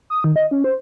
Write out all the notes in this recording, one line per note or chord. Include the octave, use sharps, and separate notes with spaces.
D#6
D#3
D#5
C#4
C5